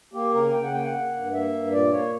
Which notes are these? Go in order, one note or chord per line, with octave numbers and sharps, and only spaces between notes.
A#3 G4
C#3 A#4
C#3 G5
F#5
A#3 G5
F#5
A#3
G2
A#3 E5
G2
A#2 D5
A#3 C#5